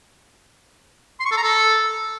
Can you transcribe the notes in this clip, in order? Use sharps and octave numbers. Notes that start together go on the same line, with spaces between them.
C6
C#6
A4
A#5
A4